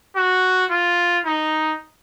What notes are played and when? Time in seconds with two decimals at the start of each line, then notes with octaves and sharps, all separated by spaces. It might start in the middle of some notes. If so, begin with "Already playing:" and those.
0.16 F#4
0.71 F4
1.25 D#4